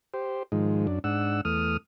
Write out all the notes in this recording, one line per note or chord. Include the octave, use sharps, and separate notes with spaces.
G4 C5
G#2 D#3 F3 G#3
F#2 D4
G#2 D4 F#5 E6
E2 A3 D#6 F6